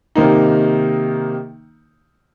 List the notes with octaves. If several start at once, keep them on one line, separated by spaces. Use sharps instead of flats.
C3 D#3 A#3 D#4